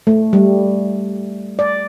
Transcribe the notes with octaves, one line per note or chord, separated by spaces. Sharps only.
A3
G3
D5